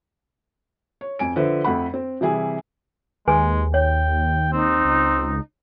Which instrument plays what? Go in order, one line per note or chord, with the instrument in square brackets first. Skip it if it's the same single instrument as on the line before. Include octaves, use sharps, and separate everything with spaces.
[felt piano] C#5
F2 G#5 D7
D3 F3 B4 C5 E5
F2 A3 F#5 B5
C4
C3 E3 G3 E4 G#4
[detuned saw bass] D#2 [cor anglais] G#3 [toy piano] G#4 B4 G#5
[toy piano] C#5 [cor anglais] G5
[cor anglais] C4 [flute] D#4
[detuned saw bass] C#2